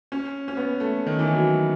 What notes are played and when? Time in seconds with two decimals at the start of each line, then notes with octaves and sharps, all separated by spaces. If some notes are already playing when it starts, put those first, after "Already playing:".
0.12 C#4
0.48 C#4
0.57 B3
0.80 A3
1.07 D#3
1.19 E3
1.34 F#3